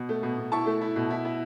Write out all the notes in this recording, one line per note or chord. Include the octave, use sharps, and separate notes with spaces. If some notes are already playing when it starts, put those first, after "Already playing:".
Already playing: B2
A3
B2
B2
E4 A5 C#6
A3
E4
B2
E4
E4